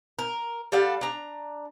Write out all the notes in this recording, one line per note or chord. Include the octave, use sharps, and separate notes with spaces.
A#4
G3 A4 F5 F#5
D4 A#5